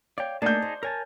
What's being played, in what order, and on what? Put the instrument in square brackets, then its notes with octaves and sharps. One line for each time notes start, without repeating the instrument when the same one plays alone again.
[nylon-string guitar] C#5 F5 [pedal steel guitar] D5 G5
[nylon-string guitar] A3 A#3 D4 [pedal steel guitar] D#4 G#4 A5 [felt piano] D5 G6
[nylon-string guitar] C5
[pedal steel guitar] A#4 G#5 A5 [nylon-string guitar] C#5